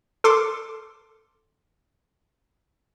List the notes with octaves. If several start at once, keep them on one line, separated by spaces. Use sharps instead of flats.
A4 C6 D6